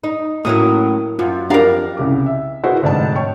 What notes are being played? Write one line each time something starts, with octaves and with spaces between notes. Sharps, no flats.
D#4
A2 F#3 A#3 C#4 E4 A#4 D#6
F#2 F4
F2 D4 G4 A#4 D5 F5 A#5 B5
C2 C#3 D6
E5
A#3 E4 F#4 G#4 B4 C5
F1 G#2 D3 D5 D#5 A5
C#5 G5 C#6